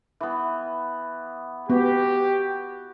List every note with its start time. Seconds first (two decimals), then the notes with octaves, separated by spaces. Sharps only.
0.21 E3 B3
1.70 B3 F#4 G4